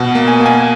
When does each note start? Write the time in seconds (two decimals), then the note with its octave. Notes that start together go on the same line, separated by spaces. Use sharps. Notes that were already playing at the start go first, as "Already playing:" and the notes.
Already playing: B2 F#5
0.15 A#3
0.28 G#5
0.41 A#3
0.46 G#5